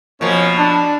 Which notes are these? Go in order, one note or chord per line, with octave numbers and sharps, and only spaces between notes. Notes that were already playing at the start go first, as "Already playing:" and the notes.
B2 F3 A#3 C#4 C#5
D4 A5